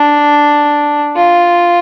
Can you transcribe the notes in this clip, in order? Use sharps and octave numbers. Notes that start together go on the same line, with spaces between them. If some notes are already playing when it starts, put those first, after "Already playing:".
Already playing: D4
F4